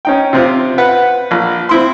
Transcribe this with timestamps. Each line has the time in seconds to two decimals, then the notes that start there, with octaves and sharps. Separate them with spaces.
0.05 C#4 D#4 G5
0.33 C3 C4 F4
0.78 B4 F#5
1.31 A#1
1.69 C4 E4 C6